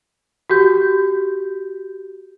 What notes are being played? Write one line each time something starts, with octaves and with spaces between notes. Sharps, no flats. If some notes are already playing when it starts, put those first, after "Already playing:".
F#4 G4 G6